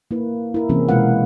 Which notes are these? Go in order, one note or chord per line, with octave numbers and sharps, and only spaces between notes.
A#3 E4 B4
E4 A#4
C3 E3 A#3 C4 C#4 G#4
B2 G#3 F4 B4 F5 F#5